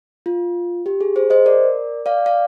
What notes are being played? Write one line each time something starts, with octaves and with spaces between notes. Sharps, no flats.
F4
G4
G#4
G#4 C5
C5 D#5
A#4 D5
D5 F5
D5 F5